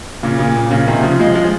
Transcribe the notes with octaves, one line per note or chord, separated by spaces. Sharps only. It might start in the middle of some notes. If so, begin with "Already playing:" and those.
A#2 C#3
A#2 C#3
A#2
A#2 C#3
C3 D#3
C#3 F3
F3 G#3
F3 G#3